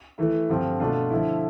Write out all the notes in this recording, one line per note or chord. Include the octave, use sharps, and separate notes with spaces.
E3 A3 E4
G2 D3 F3 C4 F4
B2 A3 D4 F4
D3 F3 A3 E4